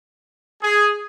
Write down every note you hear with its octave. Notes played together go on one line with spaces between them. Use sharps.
G#4